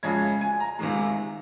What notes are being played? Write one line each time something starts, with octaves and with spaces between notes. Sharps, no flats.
F2 C#3 G#3 G#6
G#5
A#5
C#2 C3 D#3 G#3